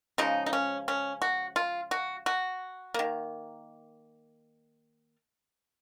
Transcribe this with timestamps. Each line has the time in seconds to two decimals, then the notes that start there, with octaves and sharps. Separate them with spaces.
0.18 C#3 F3 G#3 D#4
0.46 D#4
0.53 C#4
0.88 C#4
1.22 F#4
1.56 F4
1.91 F#4
2.26 F#4
2.94 D#3 A#3